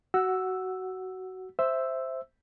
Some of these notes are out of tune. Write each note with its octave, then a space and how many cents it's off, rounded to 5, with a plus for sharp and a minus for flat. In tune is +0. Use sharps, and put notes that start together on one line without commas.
F#4 +15 F#5 +0 E6 +0
C5 +0 E5 +0 E6 +0